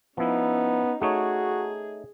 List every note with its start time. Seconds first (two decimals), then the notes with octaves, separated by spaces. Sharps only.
0.18 F3 B3 C#4 D#4 E4
1.01 A3 D#4 F#4 G#4 C#5